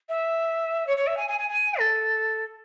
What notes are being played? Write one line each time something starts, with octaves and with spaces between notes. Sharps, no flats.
E5
C#5
C#5
E5
G#5
G#5
G#5
G#5
A4